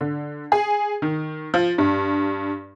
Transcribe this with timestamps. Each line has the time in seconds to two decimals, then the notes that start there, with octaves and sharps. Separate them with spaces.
0.01 D3
0.52 G#4
1.02 D#3
1.54 F3
1.78 G2